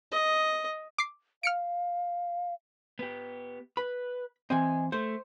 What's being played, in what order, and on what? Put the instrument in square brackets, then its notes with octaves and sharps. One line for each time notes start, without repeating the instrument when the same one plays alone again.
[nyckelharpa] D#5
[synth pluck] D6 C7
[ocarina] F5 [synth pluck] F6 C#7 D7
[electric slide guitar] B3 G4
[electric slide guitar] B4 [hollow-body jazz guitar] B5
[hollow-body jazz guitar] E3 C4 [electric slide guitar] D#5 G#5
[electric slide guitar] A3 [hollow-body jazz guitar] C5